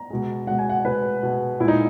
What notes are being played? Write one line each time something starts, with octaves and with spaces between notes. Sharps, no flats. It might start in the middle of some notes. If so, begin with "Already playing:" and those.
Already playing: A#5
B2 G#3
B2 G#3 F#5
G#5
F#5
B2 G#3 B4
B2 G#3
A#2 G#3 E4
D#4